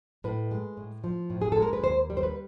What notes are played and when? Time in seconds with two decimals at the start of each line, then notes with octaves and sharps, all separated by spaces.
0.24 A2 B4
0.51 G#3
0.77 A2
1.04 F3
1.30 A2
1.42 G#4
1.52 G#3 A4
1.62 A#4
1.73 B4
1.83 D#2 C5
2.10 G3
2.17 C5
2.23 B4